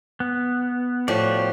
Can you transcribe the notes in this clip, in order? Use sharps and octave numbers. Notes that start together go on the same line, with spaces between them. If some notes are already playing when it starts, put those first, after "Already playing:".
B3
A2 F3 F#4 G4 D5